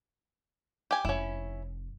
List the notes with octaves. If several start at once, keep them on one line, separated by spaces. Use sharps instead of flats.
G4 G#5
F1 C#4 E4